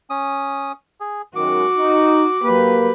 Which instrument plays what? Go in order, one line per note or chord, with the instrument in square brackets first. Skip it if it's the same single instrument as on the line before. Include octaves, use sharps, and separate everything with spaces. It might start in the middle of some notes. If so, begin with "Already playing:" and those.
[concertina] C#4 D#6
G#4
[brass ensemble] F#2 D#3 G#3 [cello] F#4 [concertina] D6
[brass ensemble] D#4
[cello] F#3 B4 [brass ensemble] A#3 G4